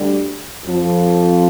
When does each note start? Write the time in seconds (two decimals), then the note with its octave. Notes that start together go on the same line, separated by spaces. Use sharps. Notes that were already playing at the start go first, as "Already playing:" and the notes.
Already playing: D2 D3 G3
0.65 F2 F3